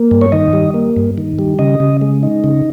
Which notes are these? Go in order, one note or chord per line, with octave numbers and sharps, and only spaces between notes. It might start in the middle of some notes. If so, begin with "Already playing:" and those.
Already playing: A#3
G2
C#5
D#3 D#5
G3
A#3
G2
D#3
G3
C#3 D#5
C#3
G#3
D#4
C#3